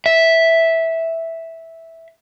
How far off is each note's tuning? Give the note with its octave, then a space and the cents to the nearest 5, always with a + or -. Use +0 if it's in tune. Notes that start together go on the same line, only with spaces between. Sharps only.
E5 -5